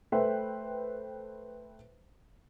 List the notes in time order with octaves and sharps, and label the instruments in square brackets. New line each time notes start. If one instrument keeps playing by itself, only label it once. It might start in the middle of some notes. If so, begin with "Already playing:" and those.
[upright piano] A3 B4 C5 E5 G5